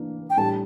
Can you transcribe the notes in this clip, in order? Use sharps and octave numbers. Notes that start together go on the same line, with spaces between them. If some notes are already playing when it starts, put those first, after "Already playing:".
Already playing: E3 A#3 D4
G5
A2 G3 D4 G4 A5